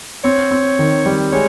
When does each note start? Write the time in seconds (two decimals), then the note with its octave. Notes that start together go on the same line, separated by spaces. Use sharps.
0.24 C4 C#5
0.51 C4
0.79 D#3
1.06 G3
1.33 G#3 C#5